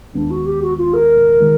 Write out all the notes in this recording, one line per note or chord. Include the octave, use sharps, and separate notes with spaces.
D#2 D#3 G#3 B3 D4
F#4
G4
F#4
F4
A#4
D#3 G#3